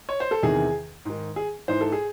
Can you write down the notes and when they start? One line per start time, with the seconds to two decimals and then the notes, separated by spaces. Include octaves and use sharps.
0.09 C#5
0.20 C5
0.31 A4
0.43 E2 C3 D#3 G#4
1.05 G#2 D#3
1.36 G#4
1.68 G#2 E3 C5
1.81 A4
1.92 G#4